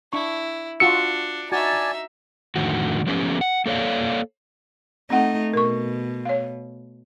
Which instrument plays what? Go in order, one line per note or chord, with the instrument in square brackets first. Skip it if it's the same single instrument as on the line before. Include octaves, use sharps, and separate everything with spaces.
[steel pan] D4 C#6 [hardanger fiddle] E4
[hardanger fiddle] D4 [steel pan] F4 F#4 E6 [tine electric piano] C#7
[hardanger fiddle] D#4 E5 [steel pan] F#4 [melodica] D5 G#5 A5
[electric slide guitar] F2 A2 D3 D#3 F#4
F3 A3 B3 C#4 G4
F#5
A#3 A4 C#5 D5 F5
[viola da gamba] A3 D#4 [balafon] C4 F#5
[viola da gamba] B2 [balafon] A#4 C#6
[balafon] C#5 F5